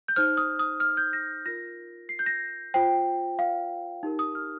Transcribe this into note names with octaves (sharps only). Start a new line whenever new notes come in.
G6
D#4 C5 F6
D#6
D#6
F6
G6
A#6
F4 A#4 A#6
C7
G6
A#6
F4 C5 G5
F5
D#4 G4 A#4
D#6
F6